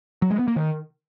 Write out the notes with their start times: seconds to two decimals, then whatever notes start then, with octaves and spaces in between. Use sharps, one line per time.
0.22 F#3
0.31 G#3
0.39 B3
0.48 A#3
0.56 D#3